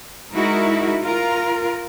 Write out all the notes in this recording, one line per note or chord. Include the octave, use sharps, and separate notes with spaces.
G#3 D#4 E4 F#4 A#4
F4 A#4